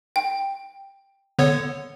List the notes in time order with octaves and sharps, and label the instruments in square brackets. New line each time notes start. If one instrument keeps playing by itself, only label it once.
[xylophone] G5
[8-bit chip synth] D3 B3 C#5